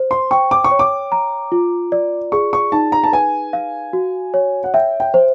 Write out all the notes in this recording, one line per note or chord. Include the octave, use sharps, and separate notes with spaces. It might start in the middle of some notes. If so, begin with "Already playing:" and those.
Already playing: C5
C6
G5 C#6
D6
C#6
C#5
D6
A#5
F4
D5
G#4 C#6
C#6
D#4 A5
A#5
A5
B4 G#5
F5
F#4
C#5
F#5
E5 G5
G5
C5